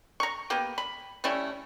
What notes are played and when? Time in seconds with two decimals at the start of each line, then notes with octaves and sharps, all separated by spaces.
0.20 A#5 C#6
0.50 A#3 B3 G4
0.78 B5
1.24 G3 A3 C#4 E4